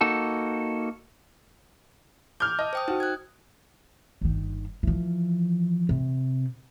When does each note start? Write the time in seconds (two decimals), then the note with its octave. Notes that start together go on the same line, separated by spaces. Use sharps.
0.01 A#3 D#4 F#4 A4
2.40 D6 F6 G6
2.59 D#5 A5
2.73 C5 G5 D#6
2.88 D#4 F#4
3.00 F#6 G#6
4.21 G1 D#3
4.83 E3 F3
5.89 C3